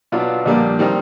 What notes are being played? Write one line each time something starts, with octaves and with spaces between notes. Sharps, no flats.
B2 F#3 B3 D4 F4
A#1 A#2 G3 A#3 D4
D#3 G3 C4 D#4